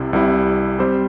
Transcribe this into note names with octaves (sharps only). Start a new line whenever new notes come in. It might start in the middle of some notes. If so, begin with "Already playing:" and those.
Already playing: C2 C3 G3 E4
C2 C3 G3 E4
G3 C4 G4 C5